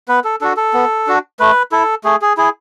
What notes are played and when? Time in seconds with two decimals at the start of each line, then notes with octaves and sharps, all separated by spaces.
0.08 B3 B4
0.24 A4
0.41 D4 F#4 A4
0.57 A4
0.74 B3
1.07 D4 F#4
1.40 A3 B4
1.72 E4 A4
2.04 A3 G#4
2.22 G#4
2.37 E4 G#4